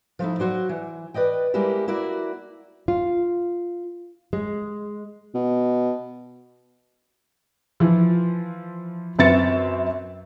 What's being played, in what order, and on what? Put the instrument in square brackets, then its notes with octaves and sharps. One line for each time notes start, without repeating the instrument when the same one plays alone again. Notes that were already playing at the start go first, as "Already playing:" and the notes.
[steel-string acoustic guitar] F3 A3 D#4 E4
F#3 F#4 C5 D5
E3
B4 D5 D#5 G5
G3 G#3 A#3 E4 G4
A#3 E4 F#4 D5
[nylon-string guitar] F4
G#3
[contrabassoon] B2
[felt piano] E3 F3
F#2 C4 B4 E5 A6 C#7